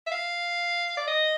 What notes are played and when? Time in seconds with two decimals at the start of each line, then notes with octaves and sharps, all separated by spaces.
0.07 E5
0.11 F5
0.97 D5
1.08 D#5